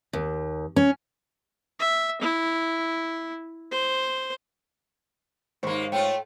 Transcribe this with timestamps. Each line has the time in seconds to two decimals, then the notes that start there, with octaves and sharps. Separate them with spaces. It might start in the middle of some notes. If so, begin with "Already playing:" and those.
0.13 D#2
0.76 C#4
1.79 E5
2.22 E4
3.72 C5
5.63 D#2 G#2 A#3 C5 C#6
5.92 A3 F4 C#5 G5